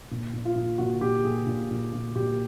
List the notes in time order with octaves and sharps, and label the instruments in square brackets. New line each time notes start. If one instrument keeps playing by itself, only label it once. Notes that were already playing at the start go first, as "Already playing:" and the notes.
[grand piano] A#2
A#2
F4
A#2
A#2 F#4
A#2 G4
A#2 G#4
A#2
A#2
A#2
A#2 G4